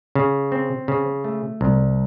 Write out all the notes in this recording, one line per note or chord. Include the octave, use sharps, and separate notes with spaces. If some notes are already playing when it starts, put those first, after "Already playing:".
C#3
C4
C#3
A3
C2